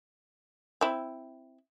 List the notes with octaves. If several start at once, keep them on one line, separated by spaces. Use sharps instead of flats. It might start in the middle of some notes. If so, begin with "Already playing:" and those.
C4 E4